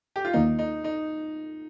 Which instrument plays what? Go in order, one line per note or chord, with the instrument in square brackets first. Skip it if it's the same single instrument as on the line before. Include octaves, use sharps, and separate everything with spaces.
[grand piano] G4
F4
[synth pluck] D#2 D#3 A#3 [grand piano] D#4
[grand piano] D#4
D#4